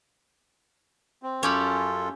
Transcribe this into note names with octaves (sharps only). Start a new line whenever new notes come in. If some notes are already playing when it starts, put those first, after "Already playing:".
C4
F#2 C#4 F4 G4 A4 B5